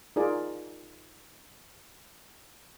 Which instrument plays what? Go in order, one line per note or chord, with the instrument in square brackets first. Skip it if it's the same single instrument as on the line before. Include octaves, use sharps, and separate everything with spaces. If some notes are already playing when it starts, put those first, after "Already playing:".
[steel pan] D#4 F4 G#4 A#4 D5